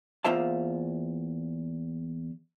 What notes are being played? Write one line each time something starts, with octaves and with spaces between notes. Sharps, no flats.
E2 A#3 F4 C5 E5 A5